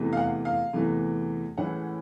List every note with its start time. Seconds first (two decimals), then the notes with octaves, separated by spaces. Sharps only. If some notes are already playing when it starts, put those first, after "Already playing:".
Already playing: E2 C3 E3 A3
0.13 F5
0.17 F#5
0.45 F5
0.73 E2 C3 E3 A3
1.58 A2 E3 G#3 C#4 E4 F#5